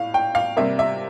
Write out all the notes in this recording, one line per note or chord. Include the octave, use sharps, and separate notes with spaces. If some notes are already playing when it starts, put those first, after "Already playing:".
Already playing: A2 F5
G5
F5
C3 G3 A#3 E5
E5